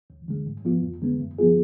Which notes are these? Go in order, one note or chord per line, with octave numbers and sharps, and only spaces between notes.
D2
D3 G#3
G#2
F3 B3 F4
F2
D3 G#3 B3
F#2
F3 B3 F4 G#4